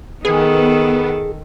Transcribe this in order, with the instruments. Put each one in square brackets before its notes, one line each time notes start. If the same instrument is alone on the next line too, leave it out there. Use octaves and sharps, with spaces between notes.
[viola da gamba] D#3 A4 [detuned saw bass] B3 [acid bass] G#4